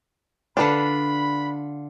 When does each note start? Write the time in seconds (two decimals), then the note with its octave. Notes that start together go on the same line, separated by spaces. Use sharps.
0.57 D3 D4 F4 B4 B5